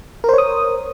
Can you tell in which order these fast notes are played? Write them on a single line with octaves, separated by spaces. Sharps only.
A#4 C5 C#5 D#6